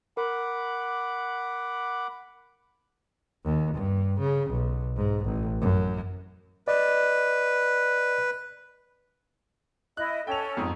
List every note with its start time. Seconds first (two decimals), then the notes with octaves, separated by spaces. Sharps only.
0.17 A#4 F#5 B5 D6
3.45 D#2
3.75 G2
4.20 C#3
4.51 B1
4.97 G#2
5.25 A1
5.61 F#2
6.68 B4 D5 D#5
9.97 E4 D#5 F#6
10.27 C#4 A4 G5 F7
10.57 F2 G#2 D#6